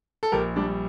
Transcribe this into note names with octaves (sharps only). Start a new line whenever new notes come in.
A4
A#1 G4 A#4
G3 D4